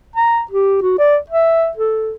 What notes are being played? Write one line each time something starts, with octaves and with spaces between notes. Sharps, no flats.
A#5
G4
F#4
D5
E5
A4